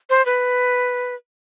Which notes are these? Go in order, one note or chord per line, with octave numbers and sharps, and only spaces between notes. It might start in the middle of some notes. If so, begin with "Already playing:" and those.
C5
B4